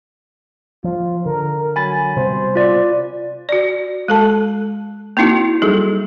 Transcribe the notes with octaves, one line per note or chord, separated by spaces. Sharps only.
F3 F4
D3 A#4
F#3 G#5 B5 A6
C3 G3 B3 C5
F4 D5
F#4 D5
G#3 A4 A5
A#3 C4 D#4 E4 F#4
F#3 G3 D#4 G#4 A4